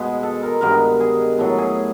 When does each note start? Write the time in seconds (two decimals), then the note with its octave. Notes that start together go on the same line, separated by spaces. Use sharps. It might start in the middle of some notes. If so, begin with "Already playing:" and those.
Already playing: B2 G#3 B3 G#4
0.23 A4
0.43 A#4
0.61 G2 D#3 G#3 B3 A#4
1.00 G#4
1.39 A2 F#3 B3 A4
1.58 G#4